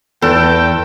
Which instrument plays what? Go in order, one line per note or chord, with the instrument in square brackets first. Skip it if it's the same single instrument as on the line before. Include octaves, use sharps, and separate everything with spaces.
[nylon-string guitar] E2 [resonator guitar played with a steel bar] A4 [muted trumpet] G5